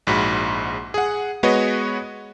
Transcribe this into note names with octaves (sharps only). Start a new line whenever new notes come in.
A#1 G#2 F#4 B5
G#4 F#5
G#3 B3 F#4 B4 C#5 D#5